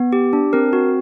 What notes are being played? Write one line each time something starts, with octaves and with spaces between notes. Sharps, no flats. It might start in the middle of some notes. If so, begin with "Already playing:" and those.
Already playing: B3
G4
D4
C4 A#4
F#4